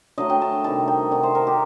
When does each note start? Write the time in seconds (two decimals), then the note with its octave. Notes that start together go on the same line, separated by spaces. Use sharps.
0.18 D3 F#3 A3 D#5
0.30 G5
0.42 A5
0.64 C3 D#3 G3 A5
0.88 G5
1.11 C3 D#3 G3 F#5
1.23 C5
1.35 A#4
1.47 G4